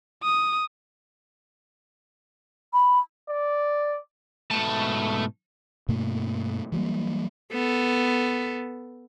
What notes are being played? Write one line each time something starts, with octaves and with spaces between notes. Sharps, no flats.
D#6
B5
D5
G#2 B2 A3 A5
G2 B2 A3 A#3
E3 F#3 G3 A#3
B3 A4